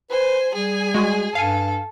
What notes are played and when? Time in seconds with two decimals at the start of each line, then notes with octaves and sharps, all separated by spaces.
0.10 B4 C5 G#5
0.55 G3 G#4 G#5
0.95 G#3 F#4
1.35 G2 A4 F5 G#5